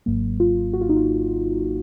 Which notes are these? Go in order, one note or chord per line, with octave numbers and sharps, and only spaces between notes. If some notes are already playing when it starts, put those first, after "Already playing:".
G#1 G#2 F#3 A#3
F4
F#4
F4
D#4
F4